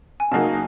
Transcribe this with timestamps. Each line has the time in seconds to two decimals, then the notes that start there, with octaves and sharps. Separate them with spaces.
0.20 G#5
0.32 C#3 F#3 A#3 D#4 F#4 A5